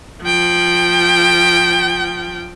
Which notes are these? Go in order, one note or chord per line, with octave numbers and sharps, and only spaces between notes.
F3 G5